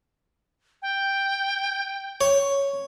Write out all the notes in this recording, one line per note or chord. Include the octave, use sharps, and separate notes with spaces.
G5
C#5